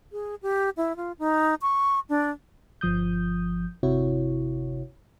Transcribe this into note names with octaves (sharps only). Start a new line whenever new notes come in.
G#4
G4
E4
F4
D#4
C#6
D4
G1 F3 D#6 G6
G1 C3 E4 F#4 C#5